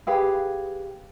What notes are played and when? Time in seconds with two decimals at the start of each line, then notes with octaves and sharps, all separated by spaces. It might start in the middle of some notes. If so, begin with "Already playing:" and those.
0.07 G4 G#4 B4 F5